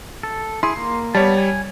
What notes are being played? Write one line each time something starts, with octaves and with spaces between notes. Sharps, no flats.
A4
E4 G#4 C6
A#3
G3 B3 C#5 A5
G#5